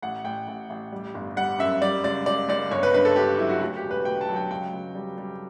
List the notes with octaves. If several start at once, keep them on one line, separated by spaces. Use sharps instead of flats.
A1 F#5
A1 G5
A1
A1
G3
G1
G3 F#5
F#2 E5
G3 D5
C#2 D5
C#2 D5
C#2 D5
G1 C#5
B4
G2 B4
A4
G1 G4
F#3 E4
F#4
D2 F#4
G4
E1
B4
D2 G5
A5
F#3
G5
C#2 G5
C#2
G3
G3